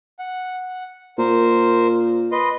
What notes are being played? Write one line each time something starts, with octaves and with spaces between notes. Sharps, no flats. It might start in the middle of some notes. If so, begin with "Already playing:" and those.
F#5
A#2 A#4 C5
B4 D#5 C6